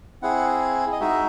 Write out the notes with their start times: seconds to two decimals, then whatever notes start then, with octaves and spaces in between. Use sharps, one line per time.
0.22 C4 E4 G#4 F#5
0.92 D#5
1.00 G#3 D#4 F#4 E5